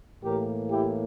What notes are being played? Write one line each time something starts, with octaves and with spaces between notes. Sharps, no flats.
A2 E3 A#3 G4 A#4
E4 G4